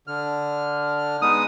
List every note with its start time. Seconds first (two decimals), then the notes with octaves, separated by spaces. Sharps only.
0.07 D3 F6
1.22 G#3 B3 D#4 D#6